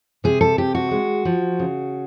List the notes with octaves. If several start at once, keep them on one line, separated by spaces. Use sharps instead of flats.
C3 G#4
A4
C3 G4
F#4
G#3
F3
C#3